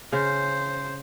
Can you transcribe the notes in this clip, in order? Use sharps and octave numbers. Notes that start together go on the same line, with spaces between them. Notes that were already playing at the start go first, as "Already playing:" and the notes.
C#3 C5